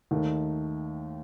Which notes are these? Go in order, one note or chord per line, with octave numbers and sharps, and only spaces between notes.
D#2 D#3 A3